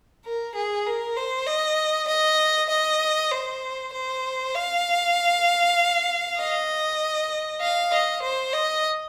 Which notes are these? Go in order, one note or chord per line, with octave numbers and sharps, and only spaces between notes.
A#4
G#4
A#4
C5
D#5
D#5
D#5
C5
C5
F5
D#5
F5
D#5
C5
D#5